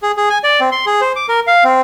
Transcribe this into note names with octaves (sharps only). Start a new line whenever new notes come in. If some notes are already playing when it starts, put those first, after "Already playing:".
G#4
G#4
G#5
D5
C4
C6
G#4
C5
D6
A#4
F5
C4